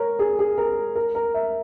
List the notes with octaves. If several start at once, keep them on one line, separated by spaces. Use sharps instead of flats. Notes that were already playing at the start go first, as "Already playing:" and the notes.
Already playing: A#4 C#5
G#4
G#4
A#4
A#4
A#4
E5